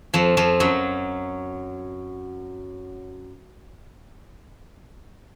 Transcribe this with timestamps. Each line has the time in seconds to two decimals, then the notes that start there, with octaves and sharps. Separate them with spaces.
0.14 F2 F3
0.37 F2 F3
0.60 F#2 F#3